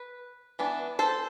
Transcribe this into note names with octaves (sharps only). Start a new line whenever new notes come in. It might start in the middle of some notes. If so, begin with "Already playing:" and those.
Already playing: B4
E3 B3 D4
A4 C5